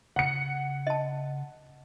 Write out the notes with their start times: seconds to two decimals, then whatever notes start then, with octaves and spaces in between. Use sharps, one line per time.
0.16 C#3 F#5 C#7
0.87 D#5 A5